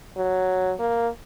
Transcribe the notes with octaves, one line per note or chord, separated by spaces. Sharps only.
F#3
A#3